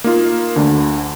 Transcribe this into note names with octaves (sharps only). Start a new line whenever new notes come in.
A#3 D#4 F4
D2 D3